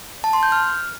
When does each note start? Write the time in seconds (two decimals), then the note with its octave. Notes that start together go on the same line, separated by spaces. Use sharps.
0.24 A5
0.33 C6
0.43 G6
0.52 F6